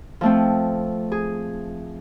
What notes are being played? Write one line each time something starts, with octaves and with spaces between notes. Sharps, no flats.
F3 A3 C4
G#4